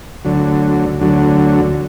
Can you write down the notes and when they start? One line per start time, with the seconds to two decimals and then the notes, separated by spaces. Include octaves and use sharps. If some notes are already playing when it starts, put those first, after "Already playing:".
0.24 D2 D3 F#3
1.01 D2 D3 F#3